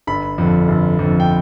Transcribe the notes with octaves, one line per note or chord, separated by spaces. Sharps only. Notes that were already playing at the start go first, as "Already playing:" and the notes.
G1 B5
F2 D3
G1
F2 D3
G5